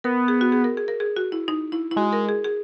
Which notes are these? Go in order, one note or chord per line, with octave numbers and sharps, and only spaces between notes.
B3 A#4
G#4
F#4
G#4
A#4
G#4
A#4
G#4
F#4
E4
D#4
E4
E4
G#3 F#4
A#4
G#4
G#4